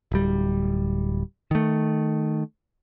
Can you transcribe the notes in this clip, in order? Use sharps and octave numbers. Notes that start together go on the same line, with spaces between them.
D1 G3
D#3 A3